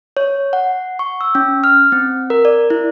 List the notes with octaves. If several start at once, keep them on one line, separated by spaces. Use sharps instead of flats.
C#5
F#5
C#6
E6
C#4
F6
C4
A#4
D5
E4